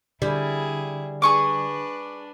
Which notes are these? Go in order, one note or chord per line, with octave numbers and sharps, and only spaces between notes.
D3 G3 E4 G#4
D4 G#4 B4 C#6 D6